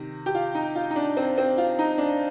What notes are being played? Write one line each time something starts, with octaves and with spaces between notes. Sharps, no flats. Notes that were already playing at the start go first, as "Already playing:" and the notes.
Already playing: C3 D#3
G4
F4
D#4
F4
D#4
D4
C4
C4
F4
D#4
D4